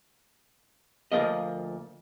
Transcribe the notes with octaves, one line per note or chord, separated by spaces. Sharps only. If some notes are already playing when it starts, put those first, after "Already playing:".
D2 B2 F3 A#3 D#5